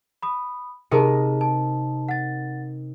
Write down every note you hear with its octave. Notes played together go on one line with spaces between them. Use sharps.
B5 D#6
C3 D#4 G#4 A#4 A5
A5
F#5 A6